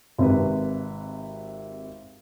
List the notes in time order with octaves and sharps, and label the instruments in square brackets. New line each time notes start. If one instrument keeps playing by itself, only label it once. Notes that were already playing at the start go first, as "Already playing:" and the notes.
[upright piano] G#1 C3 B4